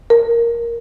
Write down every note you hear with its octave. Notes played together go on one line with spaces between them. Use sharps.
A#4